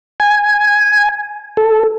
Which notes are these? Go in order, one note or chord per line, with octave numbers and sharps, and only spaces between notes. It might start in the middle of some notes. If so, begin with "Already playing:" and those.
G#5
A4